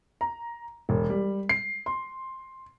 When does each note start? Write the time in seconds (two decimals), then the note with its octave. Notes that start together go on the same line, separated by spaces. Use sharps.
0.21 A#5
0.89 E1
1.10 G3
1.49 C7
1.86 C6